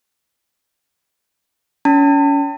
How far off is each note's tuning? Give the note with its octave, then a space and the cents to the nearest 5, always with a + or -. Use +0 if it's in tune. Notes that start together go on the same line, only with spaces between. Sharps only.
C#4 +30 A5 +35